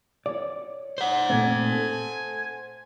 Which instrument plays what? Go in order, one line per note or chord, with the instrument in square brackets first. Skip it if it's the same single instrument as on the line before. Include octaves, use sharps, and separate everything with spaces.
[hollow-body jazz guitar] C#5 D5
[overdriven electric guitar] C5 F#5
[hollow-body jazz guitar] A#2 A3 C4 [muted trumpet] G#5
[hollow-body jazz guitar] A4